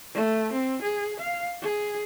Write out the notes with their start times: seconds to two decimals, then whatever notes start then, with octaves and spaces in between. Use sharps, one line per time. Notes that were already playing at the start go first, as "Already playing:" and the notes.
0.14 A3
0.52 C4
0.83 G#4
1.20 F5
1.62 G#4